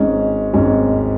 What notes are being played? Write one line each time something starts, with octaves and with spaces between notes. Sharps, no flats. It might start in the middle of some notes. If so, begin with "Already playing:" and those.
Already playing: G#1 G#2 G#3 C#4
G#1 G#2 G#3 C#4